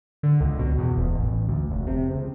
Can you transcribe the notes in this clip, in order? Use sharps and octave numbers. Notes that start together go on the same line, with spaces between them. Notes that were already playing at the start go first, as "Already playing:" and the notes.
D3
C#2
B2
E2
D#1
A1
D2
F1
C3
C#2